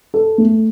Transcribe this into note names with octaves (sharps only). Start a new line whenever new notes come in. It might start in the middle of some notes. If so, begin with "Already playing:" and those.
A4
A3